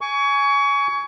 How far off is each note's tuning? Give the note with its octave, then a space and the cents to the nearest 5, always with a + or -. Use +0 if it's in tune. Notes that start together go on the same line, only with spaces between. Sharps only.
G#5 +5 C#6 +30